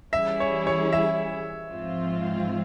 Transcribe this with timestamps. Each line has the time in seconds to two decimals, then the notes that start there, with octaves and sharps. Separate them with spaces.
0.13 E3 G3 C#4 E4 G#4 E5
0.40 C#5
0.67 C#5
0.93 E5
1.71 G#2 F3 C4 F4